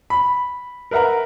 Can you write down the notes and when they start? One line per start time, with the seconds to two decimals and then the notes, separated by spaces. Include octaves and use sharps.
0.10 B5
0.91 A#4 B4 E5 F#5 A#5